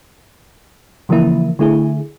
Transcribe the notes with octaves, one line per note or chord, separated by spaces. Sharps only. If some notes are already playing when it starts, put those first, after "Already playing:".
C#3 E3 F3 A#3 E4
D3 A3 E4 G#4